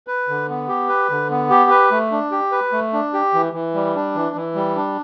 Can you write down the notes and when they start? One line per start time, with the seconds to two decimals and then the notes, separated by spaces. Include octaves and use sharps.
0.07 B4
0.28 D3
0.49 B3
0.68 G4
0.89 B4
1.10 D3
1.30 B3
1.50 G4
1.70 B4
1.91 A3
2.11 D4
2.31 G4
2.52 B4
2.72 A3
2.93 D4
3.13 G4
3.34 E3
3.53 E3
3.74 G3
3.95 D4
4.15 E3
4.36 E3
4.55 G3
4.76 D4